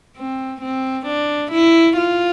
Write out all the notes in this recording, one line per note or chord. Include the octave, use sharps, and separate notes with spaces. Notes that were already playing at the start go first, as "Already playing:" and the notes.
C4
C4
D4
E4
F4